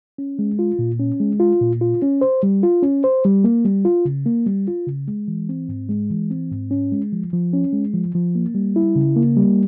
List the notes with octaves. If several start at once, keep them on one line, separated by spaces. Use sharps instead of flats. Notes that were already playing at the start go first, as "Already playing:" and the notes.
C#4
G#3
F4
A#2
C#4
G#3
F4
A#2
F4
C#4
C5
G3
F4
C#4
C5
G3
A#3
G3
F4
C#3
A#3
G3
F4
C#3
G#3
E3
C4
G#2
G#3
E3
C4
G#2
C#4
G#3
F3
F3
C#4
G#3
F3
F3
A#3
G3
E4
C#3
A#3
G3